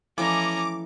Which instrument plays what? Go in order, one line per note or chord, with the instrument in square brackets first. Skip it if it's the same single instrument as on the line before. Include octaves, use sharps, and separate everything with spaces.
[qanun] E3 A3 D#5 [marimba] F3 [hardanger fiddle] C#4 A#5 [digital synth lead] D6